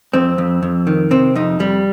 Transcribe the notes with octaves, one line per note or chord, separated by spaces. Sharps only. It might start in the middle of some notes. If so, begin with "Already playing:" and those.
F2 C4
F2
F2
D#3
C3 C4
F2 D#4
F2 G3